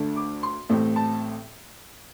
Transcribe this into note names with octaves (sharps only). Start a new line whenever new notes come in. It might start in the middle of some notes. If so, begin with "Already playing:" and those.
Already playing: D2 D3 A3 D4
D6
C6
A1 A2 A3 C4
A5